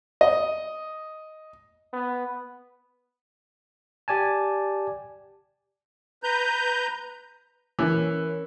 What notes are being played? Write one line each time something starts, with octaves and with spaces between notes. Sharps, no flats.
D#5
B3
G4 D5 G#5 A5
B4 A#5 G6
E3 C#4 A#4 C#5